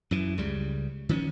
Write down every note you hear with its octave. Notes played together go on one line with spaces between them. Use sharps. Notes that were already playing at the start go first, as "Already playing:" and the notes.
F#2 E3
C#2 C#3 G3
D#3 F3 B3 C#4